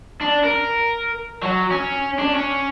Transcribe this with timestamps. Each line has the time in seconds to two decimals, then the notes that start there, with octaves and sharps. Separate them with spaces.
0.21 D4
0.44 A#4
1.43 F#3
1.71 C#4
2.19 D4
2.35 C#4